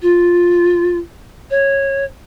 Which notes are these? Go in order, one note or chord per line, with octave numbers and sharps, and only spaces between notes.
F4
C#5